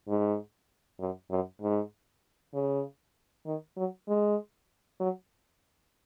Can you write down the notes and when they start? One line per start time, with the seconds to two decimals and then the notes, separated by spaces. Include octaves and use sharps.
0.08 G#2
1.00 F#2
1.31 F#2
1.62 G#2
2.54 C#3
3.46 D#3
3.77 F#3
4.08 G#3
5.00 F#3